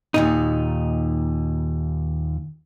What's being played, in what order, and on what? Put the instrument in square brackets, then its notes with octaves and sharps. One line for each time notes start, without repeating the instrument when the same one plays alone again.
[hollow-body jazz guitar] D#2 A#2 D#4